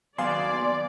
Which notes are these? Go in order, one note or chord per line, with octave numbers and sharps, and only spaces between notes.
D#2 F#3 B3 D5 F5 G#5 C6